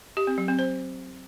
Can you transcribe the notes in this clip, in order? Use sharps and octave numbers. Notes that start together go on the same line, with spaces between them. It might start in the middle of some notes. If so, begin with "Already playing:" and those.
G4
C4
F#3
C4
C5